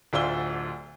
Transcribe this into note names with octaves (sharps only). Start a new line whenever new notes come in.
D1 D2 F4 D5 E6 G7